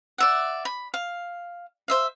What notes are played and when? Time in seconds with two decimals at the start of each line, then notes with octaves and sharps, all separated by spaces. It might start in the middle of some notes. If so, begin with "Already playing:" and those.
0.18 D5 E5 F#5
0.65 B5
0.94 F5
1.88 C5 E5 F5